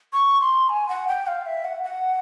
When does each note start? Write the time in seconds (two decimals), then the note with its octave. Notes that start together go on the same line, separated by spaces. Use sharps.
0.13 C#6
0.41 C6
0.69 G#5
0.89 F#5
1.08 G5
1.27 F5
1.46 E5
1.65 F#5
1.84 F#5